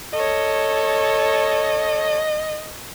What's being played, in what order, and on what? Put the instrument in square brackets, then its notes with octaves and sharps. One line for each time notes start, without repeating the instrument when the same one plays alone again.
[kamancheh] A4 C#5 [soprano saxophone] D#5